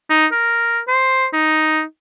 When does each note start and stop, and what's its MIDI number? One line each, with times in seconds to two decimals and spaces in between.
0.10 0.26 63
0.32 0.80 70
0.88 1.26 72
1.33 1.82 63